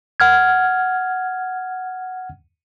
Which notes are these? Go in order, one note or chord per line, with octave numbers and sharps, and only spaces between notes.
F#5 F6 G#6